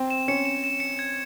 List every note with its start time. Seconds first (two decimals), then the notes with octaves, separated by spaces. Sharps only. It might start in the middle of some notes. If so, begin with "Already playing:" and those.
Already playing: C4
0.10 E7
0.28 C#4 C#7
0.45 E7
0.64 E7
0.80 C#7
0.99 G#6